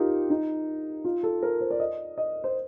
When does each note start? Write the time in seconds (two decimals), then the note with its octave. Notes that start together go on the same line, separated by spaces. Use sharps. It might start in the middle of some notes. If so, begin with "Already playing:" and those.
Already playing: D#4 F4 G4 A#4
0.30 D#4
1.04 F4
1.23 A4
1.42 A#4
1.61 C5
1.70 D5
1.80 D#5
2.17 D#5
2.44 C5